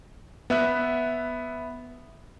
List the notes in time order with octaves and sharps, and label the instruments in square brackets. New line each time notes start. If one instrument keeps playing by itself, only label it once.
[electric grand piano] B3 E5 F#6